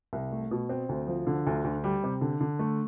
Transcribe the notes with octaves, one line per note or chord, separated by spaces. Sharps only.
C2
A3
B2
C4
D2
F3
D3
D2
D2
G3
C3
D3
D3
A3